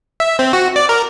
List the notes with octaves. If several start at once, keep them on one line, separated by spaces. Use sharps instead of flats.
E5
C4
F#4
D5
A#4